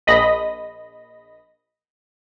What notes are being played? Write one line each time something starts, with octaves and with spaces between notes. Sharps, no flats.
A#1 D#5 B5 A#6